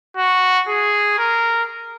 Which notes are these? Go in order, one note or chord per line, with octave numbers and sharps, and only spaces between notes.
F#4
G#4
A#4